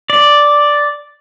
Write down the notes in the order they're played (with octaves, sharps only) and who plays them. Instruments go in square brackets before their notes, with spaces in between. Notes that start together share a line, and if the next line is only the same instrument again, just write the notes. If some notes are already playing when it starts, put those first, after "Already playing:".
[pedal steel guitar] D5